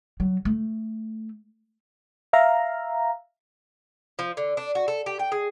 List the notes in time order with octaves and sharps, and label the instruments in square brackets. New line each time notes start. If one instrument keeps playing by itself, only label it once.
[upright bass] F#3
A3
[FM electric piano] E5 F5 A#5
[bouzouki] F3
D3
D4
F#4
A4
G4
G5
G#4